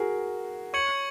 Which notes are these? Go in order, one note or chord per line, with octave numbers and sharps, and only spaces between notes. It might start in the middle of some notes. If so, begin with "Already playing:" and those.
Already playing: F#4 G#4 A#4
C#5 C#6 G#6 C#7 F#7